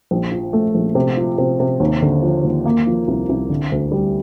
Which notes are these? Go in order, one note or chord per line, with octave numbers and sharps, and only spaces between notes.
A#1
F3
A3
A#1
C3
F3
C3
C3
D#2
D3
F3
D#2
A#3
F3
C2
C2
D3
D2
G3